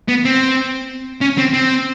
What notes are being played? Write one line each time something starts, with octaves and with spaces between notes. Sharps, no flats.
B3
C4
C#4
C4
C4